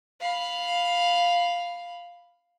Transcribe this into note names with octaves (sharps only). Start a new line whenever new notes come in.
F5 B5